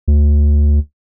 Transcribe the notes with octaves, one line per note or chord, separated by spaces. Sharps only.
D2